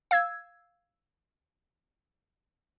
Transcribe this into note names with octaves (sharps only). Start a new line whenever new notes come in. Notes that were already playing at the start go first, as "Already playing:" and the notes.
F5 E6 G#6